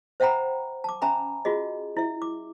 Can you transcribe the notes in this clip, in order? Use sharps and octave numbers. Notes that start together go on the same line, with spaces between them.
C5 E5 F#5 G5 A#5 B5
A5 D6
C#4 E5 G#5 A#5 B5
F4 F#4 G#4 D#5
E4 E5
D6